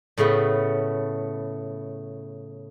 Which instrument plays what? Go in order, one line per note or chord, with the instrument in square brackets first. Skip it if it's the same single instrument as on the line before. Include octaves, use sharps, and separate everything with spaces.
[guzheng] A2 C#3 A3 B3